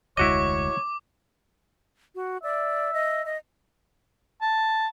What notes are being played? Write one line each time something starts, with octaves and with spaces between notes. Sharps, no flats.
F1 D2 G#3 E4 F#4 C#5 D#5 D6
F#4
D5 E5
D#5
D#5
A5